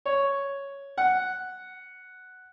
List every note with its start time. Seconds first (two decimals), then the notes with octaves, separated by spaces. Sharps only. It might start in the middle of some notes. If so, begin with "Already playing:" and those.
0.06 C#5
0.98 F#5